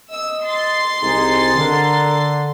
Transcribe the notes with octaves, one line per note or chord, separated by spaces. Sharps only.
D#5 E6
C6 A6 C7
C2 C4 D#4 G#4
D3 A#4